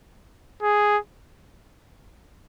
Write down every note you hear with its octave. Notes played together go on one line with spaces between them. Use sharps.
G#4